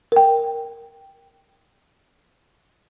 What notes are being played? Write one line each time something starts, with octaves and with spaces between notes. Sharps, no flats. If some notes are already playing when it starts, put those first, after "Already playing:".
A#4 G5